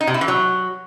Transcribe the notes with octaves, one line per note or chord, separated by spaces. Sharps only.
D#4
C3
E4
E3
F#3